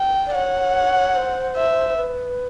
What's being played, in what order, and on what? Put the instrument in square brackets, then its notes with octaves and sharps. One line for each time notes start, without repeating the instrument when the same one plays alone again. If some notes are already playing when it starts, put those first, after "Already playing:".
Already playing: [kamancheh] G5
[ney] D5
[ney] C#5 [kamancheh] F#5
[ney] C5
[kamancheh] E5
[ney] B4